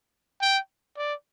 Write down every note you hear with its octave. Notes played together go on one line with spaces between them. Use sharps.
G5
D5